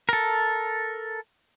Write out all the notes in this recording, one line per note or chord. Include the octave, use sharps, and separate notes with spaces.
A4 A#4